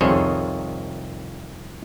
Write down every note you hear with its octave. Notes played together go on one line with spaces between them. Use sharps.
C2 F2 D#3 G#4 C5 C#5